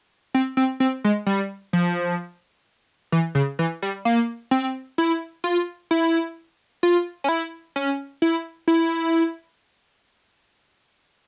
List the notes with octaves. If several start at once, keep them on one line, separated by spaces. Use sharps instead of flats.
C4
C4
C4
G#3
G3
F3
E3
C#3
E3
G3
A#3
C4
E4
F4
E4
F4
C#4
E4
C#4
E4
E4